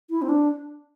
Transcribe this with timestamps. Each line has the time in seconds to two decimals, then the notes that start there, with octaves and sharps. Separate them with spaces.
0.10 E4
0.22 C4
0.29 D4